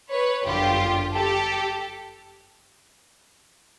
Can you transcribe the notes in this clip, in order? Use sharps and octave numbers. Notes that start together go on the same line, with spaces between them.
B4 C#5
G1 F#2 D3 F4 G4
G4 A4